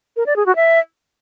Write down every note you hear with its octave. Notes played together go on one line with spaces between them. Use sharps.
A#4
D5
G#4
F#4
E5